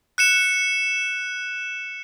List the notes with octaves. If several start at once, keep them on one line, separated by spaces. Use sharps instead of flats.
F#6 C#7 E7